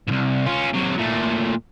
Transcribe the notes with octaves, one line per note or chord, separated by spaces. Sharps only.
C2 G#2
C#4 F4
C3 F#3
A#2 A3